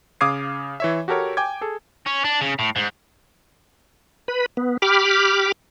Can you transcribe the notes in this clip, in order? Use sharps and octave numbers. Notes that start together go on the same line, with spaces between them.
C#3 F5 D6 D#6 G#6 C7
E3 C#5 E5
F#4 G4 A4 A#4 C#5
G5 G#5 D6 G#6
G#4 A4
C#4
D4
C#3
A2
G#2
B4 B5
B3
G4 B5 D6 F6